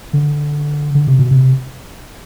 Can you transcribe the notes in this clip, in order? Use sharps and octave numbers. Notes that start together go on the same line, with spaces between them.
D3
D3
C3
B2
C3